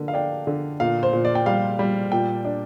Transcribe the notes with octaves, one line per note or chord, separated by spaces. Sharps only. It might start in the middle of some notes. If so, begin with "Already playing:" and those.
Already playing: D3 A#3
F5
D4 G5
D3
A#2 F5
C5
A#2
D5
G5
G3 F5
G3
A#2 G5
D4